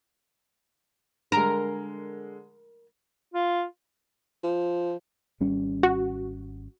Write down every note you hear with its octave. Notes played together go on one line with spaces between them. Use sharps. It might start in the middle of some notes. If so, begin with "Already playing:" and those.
D3 G#3 A#4
F4
F3
G#1 G3 C#4
F#4